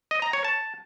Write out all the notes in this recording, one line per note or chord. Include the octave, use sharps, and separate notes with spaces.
D#5
A#5
C#5
A5